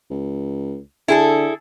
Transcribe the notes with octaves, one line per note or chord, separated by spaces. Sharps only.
C#2
D3 E4 G#4 A4